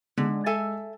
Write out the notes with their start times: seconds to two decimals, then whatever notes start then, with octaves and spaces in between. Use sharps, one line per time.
0.17 D3 G#3
0.46 A4 E5 G#5